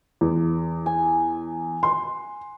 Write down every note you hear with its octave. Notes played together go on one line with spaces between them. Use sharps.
E2
G#5
C6